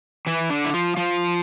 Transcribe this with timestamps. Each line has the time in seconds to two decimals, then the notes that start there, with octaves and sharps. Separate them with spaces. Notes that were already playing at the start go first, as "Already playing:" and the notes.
0.27 E3 E4
0.50 D3 D4
0.65 E4
0.74 F3 F4
0.97 F3 F4